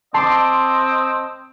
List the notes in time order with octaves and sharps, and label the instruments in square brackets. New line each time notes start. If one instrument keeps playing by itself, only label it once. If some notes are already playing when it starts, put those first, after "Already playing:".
[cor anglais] C4 [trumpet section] D#5 [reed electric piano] A5 [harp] C6 D6